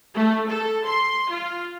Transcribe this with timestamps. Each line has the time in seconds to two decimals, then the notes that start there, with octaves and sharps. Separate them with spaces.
0.15 A3
0.49 A4
0.85 C6
1.30 F4